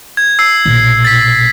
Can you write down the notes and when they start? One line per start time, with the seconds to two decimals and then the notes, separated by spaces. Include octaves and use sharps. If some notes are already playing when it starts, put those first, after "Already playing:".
0.17 G#6
0.39 E6 C7
0.65 A#1 B2
1.05 A6 B6